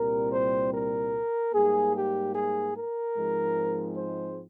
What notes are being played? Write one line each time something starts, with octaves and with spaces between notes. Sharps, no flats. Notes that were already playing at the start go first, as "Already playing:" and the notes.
Already playing: C2 A#2 G3 C4 A#4
C5
A#4
G#2 G3 A#3 G#4
G4
G#4
A#4
G#2 F3 G#3 C4
C5